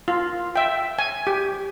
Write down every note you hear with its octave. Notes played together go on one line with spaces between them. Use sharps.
F4
E5 G5
G#5
G4